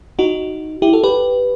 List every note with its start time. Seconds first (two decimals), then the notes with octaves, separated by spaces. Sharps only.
0.19 D#4 F#4
0.82 E4 G4
0.93 F#4 A4
1.04 G4 B4